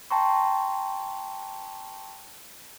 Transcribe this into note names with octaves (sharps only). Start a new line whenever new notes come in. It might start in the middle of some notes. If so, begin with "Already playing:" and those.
G5 A5 A#5 C6 C#6